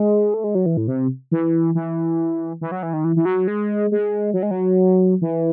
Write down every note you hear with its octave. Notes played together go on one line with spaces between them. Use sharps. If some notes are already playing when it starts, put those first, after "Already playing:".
Already playing: G#3
A3
G#3
F#3
E3
A2
C3
E3
E3
E3
F#3
E3
D#3
E3
E3
F#3
G#3
G#3
F#3
G#3
F#3
E3